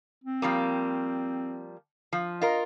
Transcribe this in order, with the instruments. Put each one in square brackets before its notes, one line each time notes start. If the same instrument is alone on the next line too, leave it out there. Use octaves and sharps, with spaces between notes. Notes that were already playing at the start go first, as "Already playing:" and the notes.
[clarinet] C4
[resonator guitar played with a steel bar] F3 G3 A#3
F3
[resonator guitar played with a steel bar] F4 A#4 [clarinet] D#5